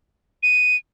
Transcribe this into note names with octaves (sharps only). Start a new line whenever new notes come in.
D#7